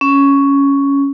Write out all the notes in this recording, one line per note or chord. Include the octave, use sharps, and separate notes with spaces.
C#4